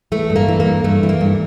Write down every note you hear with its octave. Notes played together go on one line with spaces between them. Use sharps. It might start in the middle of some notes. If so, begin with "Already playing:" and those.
E3 A3
G2
A#3
E3
A#3
G2
G2 A3
E3
A#3
G2